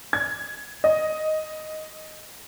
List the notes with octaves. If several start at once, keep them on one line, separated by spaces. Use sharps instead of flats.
G#6
D#5